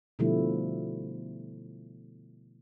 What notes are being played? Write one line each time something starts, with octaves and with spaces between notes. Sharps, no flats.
B2 D3 F3 G3 A3 E4